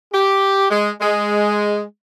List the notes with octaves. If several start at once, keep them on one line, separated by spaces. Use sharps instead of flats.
G4
G#3
G#3